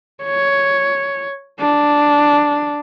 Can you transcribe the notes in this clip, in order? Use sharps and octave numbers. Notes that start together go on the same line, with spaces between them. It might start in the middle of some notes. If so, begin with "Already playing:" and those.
C#5
D4